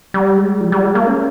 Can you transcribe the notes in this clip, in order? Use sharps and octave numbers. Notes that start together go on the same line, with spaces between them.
G3
G#3
F3
G3
G#3
A#3
C#4